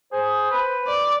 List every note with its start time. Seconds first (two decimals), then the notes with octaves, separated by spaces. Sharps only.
0.12 G#4 C5
0.51 B4
0.87 D5